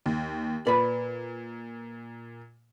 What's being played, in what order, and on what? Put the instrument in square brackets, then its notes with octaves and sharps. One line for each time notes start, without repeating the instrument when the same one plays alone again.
[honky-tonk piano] D#2
[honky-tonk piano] A#2 [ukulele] B4 [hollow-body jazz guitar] D5 B5